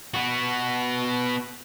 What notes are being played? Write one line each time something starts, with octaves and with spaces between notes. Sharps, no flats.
B3 F#4